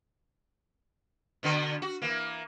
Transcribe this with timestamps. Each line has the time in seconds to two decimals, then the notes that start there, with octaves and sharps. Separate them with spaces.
1.43 B2 D3 B3
1.82 F#4
2.02 E3 A#3